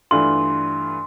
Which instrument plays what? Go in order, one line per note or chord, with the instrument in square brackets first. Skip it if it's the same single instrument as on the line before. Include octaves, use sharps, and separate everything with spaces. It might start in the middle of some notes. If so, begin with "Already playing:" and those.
[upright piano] G2 E3 A3 D4 F4 [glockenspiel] C6